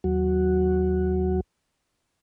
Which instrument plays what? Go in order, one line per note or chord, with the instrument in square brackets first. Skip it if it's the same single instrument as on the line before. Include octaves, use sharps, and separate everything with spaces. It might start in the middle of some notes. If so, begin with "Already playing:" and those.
[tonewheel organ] D#2 F#3 F#4